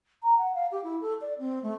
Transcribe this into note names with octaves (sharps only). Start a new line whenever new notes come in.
A#5
F#5
F5
G4
E4
A4
D5
C4
A3